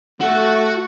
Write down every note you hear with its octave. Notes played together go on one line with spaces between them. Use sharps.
A3 F#4 F#5